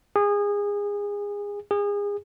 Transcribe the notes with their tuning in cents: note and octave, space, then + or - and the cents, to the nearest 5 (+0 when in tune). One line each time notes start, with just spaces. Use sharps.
G#4 -25
G#4 -30